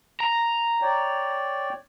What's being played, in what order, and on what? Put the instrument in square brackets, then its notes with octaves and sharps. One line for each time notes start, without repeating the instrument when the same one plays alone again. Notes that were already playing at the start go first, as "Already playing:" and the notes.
[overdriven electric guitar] A#5
[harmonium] C#5 D5 G5